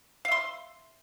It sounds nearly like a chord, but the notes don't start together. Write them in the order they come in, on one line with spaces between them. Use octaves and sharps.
F5 E5 C6